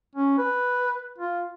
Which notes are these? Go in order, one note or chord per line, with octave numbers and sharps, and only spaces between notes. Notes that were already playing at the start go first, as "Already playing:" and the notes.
C#4
B4
F4